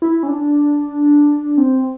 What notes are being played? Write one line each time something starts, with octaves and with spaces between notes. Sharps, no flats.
E4
C#4
D4
C4